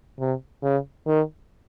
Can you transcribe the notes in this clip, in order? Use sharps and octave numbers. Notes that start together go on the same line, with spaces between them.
C3
C#3
D#3